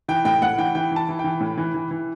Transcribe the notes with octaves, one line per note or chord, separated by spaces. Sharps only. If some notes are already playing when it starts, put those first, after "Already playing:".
E3 G5
A2 G5
A2 F#5
E3 G5
E3 G5
E3 A5
E3
G5
E3
A2
E3
E3
E3